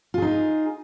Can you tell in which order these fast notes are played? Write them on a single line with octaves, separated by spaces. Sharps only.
F4 G#4 D#4